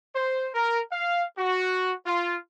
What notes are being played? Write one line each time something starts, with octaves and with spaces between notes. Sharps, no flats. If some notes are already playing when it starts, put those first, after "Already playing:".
C5
A#4
F5
F#4
F4